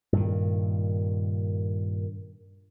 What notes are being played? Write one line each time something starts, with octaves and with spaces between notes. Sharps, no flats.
G2 A#2 D#3